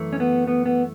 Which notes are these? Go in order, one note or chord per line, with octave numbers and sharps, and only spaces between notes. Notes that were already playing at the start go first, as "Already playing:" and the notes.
Already playing: F#2 E3 A3
C#4
B3
B3
B3